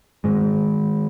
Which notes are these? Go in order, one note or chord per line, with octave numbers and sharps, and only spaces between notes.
G#2 D#3 G#3